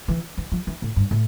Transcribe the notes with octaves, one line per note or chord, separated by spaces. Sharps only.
E3
E3
F3
E3
A2
G2
A2